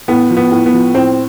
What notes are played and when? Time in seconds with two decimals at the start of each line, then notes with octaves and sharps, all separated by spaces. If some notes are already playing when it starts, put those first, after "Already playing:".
0.08 A2 B3
0.30 F3
0.37 B3
0.52 A2
0.66 B3
0.73 F3
0.94 A2 C4